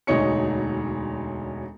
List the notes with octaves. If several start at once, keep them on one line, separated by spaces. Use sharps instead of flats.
E1 D2 D#4 C#5 C#7